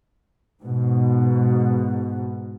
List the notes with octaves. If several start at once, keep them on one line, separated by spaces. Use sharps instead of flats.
G#2 B2